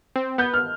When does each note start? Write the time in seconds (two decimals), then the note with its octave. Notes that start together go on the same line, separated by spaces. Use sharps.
0.16 C4
0.38 B3 G6
0.54 F6